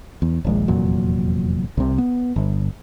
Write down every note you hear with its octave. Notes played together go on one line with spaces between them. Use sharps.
E2
D#1 A#1 G#3
F1 E2 A#2 F#3
C2 C3
B3
G1